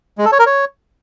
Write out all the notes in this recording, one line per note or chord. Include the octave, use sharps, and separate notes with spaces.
G#3
A4
C#5
A#4
C#5